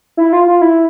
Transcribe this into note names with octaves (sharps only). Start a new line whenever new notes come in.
E4
F4
F4
E4